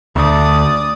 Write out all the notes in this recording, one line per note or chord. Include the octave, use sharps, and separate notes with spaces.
D2 D5 D#6